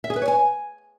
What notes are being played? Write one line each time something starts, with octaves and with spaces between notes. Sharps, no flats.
E5
G#4
B4
C#5
G#5